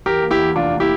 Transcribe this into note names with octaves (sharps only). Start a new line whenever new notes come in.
E2 G4 A#4
A#3
E4 G4
E2
F1 D4 F4
A#3
E4 G4